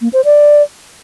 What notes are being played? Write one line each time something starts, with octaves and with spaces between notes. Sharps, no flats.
A#3
C5
D5